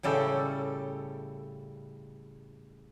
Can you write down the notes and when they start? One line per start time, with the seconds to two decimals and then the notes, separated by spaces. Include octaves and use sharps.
0.03 A2 C#3 G3 A4